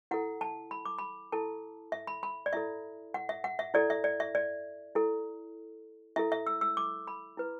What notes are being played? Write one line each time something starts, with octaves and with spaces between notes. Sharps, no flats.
E4 A4 F#5
A5
B5
D6
B5
E4 A4 A5
E5
B5
B5
D5
E4 A4 E5
F#5
E5
F#5
E5
E4 A4 D5
E5
D5
E5
D5
E4 A4
E4 A4 E5
E5
E6
E6
D6
B5
E4 B4